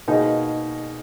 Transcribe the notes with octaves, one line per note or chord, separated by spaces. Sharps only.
B2 A#3 D#4 G#4